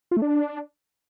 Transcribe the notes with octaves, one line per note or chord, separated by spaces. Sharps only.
F4
A3
D4